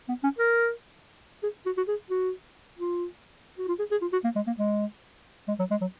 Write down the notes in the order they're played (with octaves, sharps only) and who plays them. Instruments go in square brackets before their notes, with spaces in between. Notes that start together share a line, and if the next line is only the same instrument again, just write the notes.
[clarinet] B3
C#4
A#4
G#4
F#4
F#4
G#4
F#4
F4
F#4
F4
G#4
G#4
F4
F#4
A#3
G#3
A#3
G#3
G#3
F#3
G#3
F#3